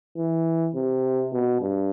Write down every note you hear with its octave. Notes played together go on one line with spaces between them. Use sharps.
E3
C3
B2
G2